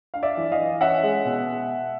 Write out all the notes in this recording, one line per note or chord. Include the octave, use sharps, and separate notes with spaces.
D4 F5
D5 E5
E3
D#5 F5
E3
C#4 E5 F#5
G#3
B2